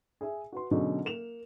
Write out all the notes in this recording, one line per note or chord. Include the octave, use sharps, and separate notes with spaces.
G#4 E5 G#5
F#4 B4 C6
B2 D3 F#3 C#4 D#4 G#4
A#3 E7 F7